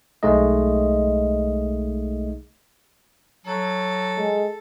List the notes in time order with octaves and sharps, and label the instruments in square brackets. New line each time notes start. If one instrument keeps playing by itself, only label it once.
[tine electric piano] B1 G#3 A3 D#4 D#5
[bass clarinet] F#3 [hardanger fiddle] A4
[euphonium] G#3